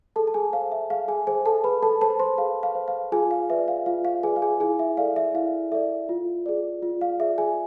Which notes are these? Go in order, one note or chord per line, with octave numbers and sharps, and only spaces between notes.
G#4 A4 A5
A5
G#4 G#5
C5 F5
E5
G#4 F5
G#4 G#5
G#4 C5 G#5
A4 A5
G#4 B4 B5
A4 A5
A4 C5 A5
C5 C6
G#4 F5
F5
C5
F5
F4 G#4 G#5
F5
B4 D5 E5
F5
F4 F5
F5
G#4 B4 D5 G#5
F5
G#4 G#5
E4 G#4 G#5
E5
A4 D5 F5
E5
E4 F5
A4 D5 E5
F4
G#4 D5
F4
F5
G#4 D5 E5
G#4 G#5